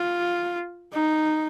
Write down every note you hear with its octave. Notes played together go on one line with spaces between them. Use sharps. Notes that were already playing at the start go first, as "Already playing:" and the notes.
Already playing: F4
D#4